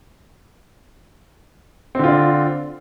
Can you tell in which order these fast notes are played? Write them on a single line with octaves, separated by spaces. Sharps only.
C4 D3 F4 D4